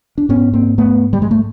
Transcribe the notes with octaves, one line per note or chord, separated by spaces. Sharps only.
D4
G#2 B3 C#4
A#3 C4
A3 B3
G3
G#3
A3